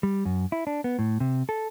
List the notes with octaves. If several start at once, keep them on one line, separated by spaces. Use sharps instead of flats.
G3
F#2
E4
D4
B3
A2
C3
A4